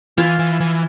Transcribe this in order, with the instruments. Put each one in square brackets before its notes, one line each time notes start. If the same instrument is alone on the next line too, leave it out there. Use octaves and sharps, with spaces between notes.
[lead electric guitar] E3 [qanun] F4 F5
[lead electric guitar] E3
E3